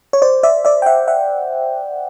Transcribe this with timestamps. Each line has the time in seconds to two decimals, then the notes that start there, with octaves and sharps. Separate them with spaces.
0.13 C#5
0.22 C5 D5
0.43 D5 E5
0.65 D5 E5
0.82 G5
0.86 E5 F#5
1.08 E5 F#5